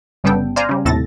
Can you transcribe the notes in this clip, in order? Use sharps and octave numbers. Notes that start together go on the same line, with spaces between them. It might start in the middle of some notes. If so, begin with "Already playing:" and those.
G1 C#3 G3 B3 A4 G5
C5 D5 F5 G#5 A#5
C#3 G3
D#2 A2 C3 A4 A6 A#6